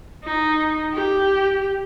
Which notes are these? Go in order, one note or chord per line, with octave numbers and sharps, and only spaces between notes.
D#4
G4